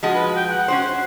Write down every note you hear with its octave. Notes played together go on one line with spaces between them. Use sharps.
F3 G#3 F#4
B4
G5
F#5
C#4 F#4 C5
C5